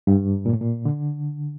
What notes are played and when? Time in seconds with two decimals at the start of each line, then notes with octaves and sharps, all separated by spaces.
0.07 G2
0.46 A#2
0.53 A2
0.61 A#2
0.85 D3